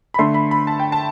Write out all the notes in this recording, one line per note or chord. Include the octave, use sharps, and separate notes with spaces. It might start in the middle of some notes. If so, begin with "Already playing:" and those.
B5
D3 A3 C6
B5
B5
A5
G5
A5